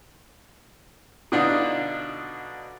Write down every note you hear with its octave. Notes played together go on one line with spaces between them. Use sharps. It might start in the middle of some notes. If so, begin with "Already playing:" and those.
B2 D3 D4 D#4 F4